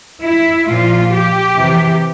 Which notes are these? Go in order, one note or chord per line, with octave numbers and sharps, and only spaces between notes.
E4
A#2 F3 F4
G4
C3 E3